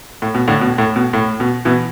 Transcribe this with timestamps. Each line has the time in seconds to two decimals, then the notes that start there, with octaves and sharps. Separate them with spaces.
0.22 A2
0.34 B2
0.48 A2 D3
0.61 B2
0.78 A2
0.96 B2
1.13 A2
1.40 B2
1.65 B2 E3